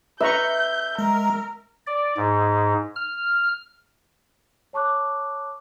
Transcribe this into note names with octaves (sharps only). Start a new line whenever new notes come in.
B4 E5 A#5 C#6 G6
G#3 A#4
D5
G#2
F6
C#5 A5 C#6 D6 F#6